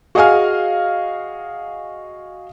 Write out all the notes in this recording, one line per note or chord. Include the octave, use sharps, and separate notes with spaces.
F#4 G#4 D#5 F5 G#5 F6